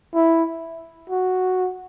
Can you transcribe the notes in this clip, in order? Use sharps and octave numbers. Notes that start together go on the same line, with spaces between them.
E4
F#4